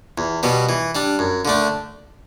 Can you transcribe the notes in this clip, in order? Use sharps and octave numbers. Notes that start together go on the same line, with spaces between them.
E2
B2 G3 B3
E3
G3 D4
F#2
D3 A3 D4